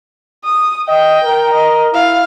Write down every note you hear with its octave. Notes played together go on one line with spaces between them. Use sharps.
D#6
D#5 G5
A#4
D#5
E4 F5